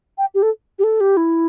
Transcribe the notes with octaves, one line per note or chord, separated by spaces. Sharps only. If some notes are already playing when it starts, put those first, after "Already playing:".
G5
G4
A4
G4
A4
G4
E4